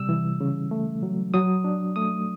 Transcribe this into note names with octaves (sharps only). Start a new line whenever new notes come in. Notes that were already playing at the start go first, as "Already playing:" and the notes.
Already playing: C3 G3 E6
E3
C#3
A3
F#3
F#3 D#6
D4
A3 D#6